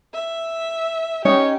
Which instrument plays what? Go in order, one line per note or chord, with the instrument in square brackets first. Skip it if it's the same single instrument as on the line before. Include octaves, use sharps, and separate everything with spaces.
[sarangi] E5
[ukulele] C#4 D#4 D#5 [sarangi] G4 [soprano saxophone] C#5